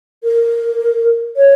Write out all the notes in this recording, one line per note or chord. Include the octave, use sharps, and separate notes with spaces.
A#4
C#5